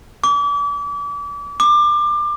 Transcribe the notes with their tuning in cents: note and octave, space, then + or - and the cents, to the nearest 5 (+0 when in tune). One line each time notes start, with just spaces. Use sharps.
D6 -35
D6 +25